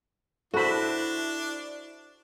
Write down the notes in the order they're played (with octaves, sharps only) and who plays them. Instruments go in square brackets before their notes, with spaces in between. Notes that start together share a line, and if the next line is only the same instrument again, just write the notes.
[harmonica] D4 [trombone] E4 [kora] F#4 C5 [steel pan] A4 B5